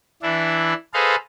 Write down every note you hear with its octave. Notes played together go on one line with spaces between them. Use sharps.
E3 D4 E4
G#4 A4 B4 C5 D#5 F5